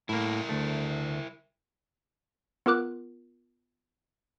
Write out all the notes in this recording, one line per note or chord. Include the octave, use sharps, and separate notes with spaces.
A2 A#3 E4 A#4
D2 A3
B3 F4 A#4 D6 F#6